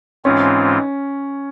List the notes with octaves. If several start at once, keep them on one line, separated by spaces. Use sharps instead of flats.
G#2 E3 G#3 C4 C#4 F4